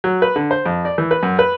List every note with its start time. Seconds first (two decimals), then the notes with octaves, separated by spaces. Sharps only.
0.04 F#3
0.22 B4
0.36 D3
0.51 C5
0.66 F2
0.85 D5
0.98 E3
1.11 B4
1.23 F#2
1.39 B4